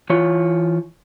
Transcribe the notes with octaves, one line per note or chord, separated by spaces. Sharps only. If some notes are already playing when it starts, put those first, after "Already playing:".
E3 F4 C#5